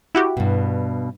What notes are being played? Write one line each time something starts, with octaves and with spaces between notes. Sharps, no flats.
E4 F#4 G4
G2 B2